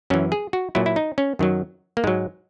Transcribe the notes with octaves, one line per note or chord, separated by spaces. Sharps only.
F#2 E3 C#4
G#4
F#4
A#2 F#3 E4
E4
D#4
C#4
F#2 D#3 F#3
A#3
G#2 F#3 G#3